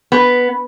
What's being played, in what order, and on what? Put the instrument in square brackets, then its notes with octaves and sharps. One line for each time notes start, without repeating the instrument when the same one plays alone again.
[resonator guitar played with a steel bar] B3